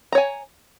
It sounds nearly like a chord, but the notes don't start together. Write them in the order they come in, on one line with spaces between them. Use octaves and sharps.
A#5 C#5 G#5